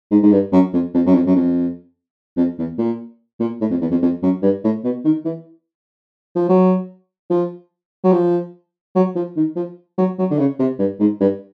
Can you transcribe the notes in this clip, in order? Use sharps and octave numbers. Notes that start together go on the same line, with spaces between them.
G#2
G#2
G2
F#2
F2
F2
F#2
F2
F#2
F2
F2
E2
A#2
A#2
A2
F2
E2
F2
F2
F#2
G2
A2
B2
D#3
E3
F3
F#3
F3
F#3
F3
F#3
F3
D#3
F3
F#3
F#3
D3
C#3
C3
G2
G#2
G2